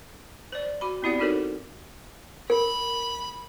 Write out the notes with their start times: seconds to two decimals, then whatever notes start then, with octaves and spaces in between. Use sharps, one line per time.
0.52 C5 D5
0.81 F#4 B5
1.02 B3 C4 E4 G4 D5 F#5
1.19 D#4 F#4 A4 A#4 C5 C#5
2.50 A#4 B5